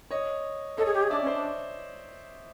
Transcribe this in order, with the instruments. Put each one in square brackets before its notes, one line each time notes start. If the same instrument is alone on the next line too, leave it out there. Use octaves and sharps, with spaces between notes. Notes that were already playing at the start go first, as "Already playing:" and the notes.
[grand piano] C#5 D#5
[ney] A4 [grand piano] C#5 D#5
[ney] G#4
G4
G#4
[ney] D4 [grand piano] D5 E5
[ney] C#4
[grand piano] C5 D5
[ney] D4